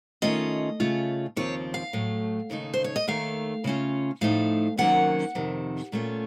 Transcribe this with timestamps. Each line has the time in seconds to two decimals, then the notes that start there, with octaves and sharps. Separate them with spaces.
0.22 D#3 A3 C#4 F4 D#5
0.80 C#3 A3 C#4 F4
1.36 D#2 C#3 F3 C4 F4 C#5
1.74 F5
1.93 A2 F#3 A3
2.50 D#2 C#3 A3 D#4
2.74 C5
2.84 C#5
2.96 D#5
3.07 D#2 D#3 A3 F5
3.64 C#3 A3 C#4 F4
4.21 A2 F3 A3 D#4 F5
4.77 C3 D#3 F#3 A#3 C#4 F#5
5.35 F2 C3 D#3
5.92 A#2 A3 C#4 F4